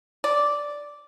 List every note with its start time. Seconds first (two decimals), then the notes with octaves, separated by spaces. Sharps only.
0.24 D5